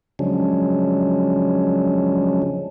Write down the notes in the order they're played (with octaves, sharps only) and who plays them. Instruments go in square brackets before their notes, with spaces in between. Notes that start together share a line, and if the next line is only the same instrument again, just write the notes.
[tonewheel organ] C#3 F3 F#3 G#3 C#4 D4